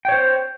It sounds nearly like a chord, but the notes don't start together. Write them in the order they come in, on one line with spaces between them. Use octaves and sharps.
G5 C#5 C5